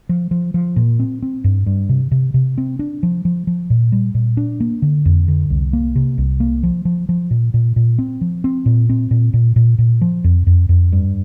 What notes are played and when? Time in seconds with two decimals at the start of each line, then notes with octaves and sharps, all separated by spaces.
0.09 F3
0.31 F3
0.54 F3
0.76 A#2
1.00 C4
1.22 C4
1.44 G2
1.66 G2
1.89 C3
2.12 C3
2.34 C3
2.58 C4
2.79 D4
3.03 F3
3.25 F3
3.47 F3
3.70 A#2
3.92 G3
4.15 A#2
4.37 D4
4.60 A#3
4.82 D3
5.05 F2
5.28 D3
5.50 C2
5.73 A#3
5.96 C3
6.18 C2
6.40 A#3
6.63 F3
6.85 F3
7.09 F3
7.31 A#2
7.54 A#2
7.76 A#2
7.99 C4
8.21 F3
8.44 C4
8.66 A#2
8.89 C4
9.11 A#2
9.34 A#2
9.56 A#2
9.78 A#2
10.01 F3
10.24 F2
10.47 F2
10.69 F2
10.92 G2